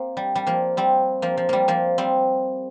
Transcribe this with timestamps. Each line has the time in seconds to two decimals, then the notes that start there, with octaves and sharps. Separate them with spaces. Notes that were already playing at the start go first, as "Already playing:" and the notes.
Already playing: A#3 C4
0.17 G3
0.35 G3
0.47 F3 A#3
0.77 G3 C4
1.22 F3 A#3
1.37 F3
1.49 G3 A#3
1.68 F3 A#3
1.98 G3 C4